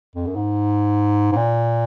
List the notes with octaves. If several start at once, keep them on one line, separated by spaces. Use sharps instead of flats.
F2
F#2
G#2
G#2
A#2